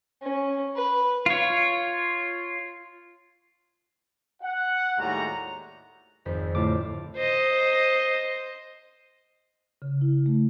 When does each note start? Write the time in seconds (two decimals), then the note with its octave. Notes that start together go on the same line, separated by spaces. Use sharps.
0.22 C#4
0.76 B4
1.26 F4 C#5
4.42 F#5
4.98 D#2 A2 G3 G#3 F#4 A#5
6.25 G#1 F2 B6
6.55 A2 D3 F4 A4 D6
7.16 C5 D#5
9.82 C#3
10.01 E4
10.26 A3